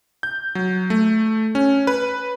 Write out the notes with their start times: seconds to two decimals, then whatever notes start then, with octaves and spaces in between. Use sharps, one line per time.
0.23 G6
0.55 F#3
0.90 A3
1.55 C#4
1.87 B4